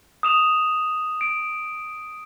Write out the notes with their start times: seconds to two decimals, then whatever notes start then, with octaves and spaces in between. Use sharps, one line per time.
0.23 D#6 E7 F7
1.21 D7